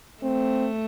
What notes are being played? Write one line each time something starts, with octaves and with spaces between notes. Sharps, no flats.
A3 C4